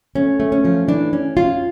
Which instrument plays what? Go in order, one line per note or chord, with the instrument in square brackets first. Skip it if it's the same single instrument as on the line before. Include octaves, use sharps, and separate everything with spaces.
[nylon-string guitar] A3 C#4
A3
C#4
F3
E3 D4
C#4
C#4 F4